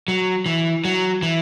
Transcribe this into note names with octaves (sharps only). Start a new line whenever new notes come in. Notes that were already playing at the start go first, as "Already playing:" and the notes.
F#3
E3
F#3
E3